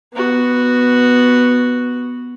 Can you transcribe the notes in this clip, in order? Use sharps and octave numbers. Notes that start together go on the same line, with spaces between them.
B3 F#4